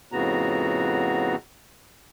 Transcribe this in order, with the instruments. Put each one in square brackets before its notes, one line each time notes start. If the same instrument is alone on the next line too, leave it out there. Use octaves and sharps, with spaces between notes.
[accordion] F2 A2 C#3 B3 F#4 A#5